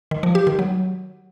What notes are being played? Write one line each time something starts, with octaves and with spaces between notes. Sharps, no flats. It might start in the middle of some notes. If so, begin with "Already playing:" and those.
D#3
F3
G4
D#3
F#3